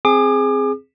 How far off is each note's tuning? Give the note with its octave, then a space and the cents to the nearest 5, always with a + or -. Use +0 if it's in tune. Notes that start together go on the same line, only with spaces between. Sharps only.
C4 +0 G#4 +0 D6 +35